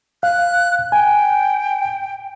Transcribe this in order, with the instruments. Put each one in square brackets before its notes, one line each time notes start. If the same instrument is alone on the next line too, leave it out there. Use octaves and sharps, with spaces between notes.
[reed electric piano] F5 [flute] F#6
[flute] G5 [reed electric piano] G#5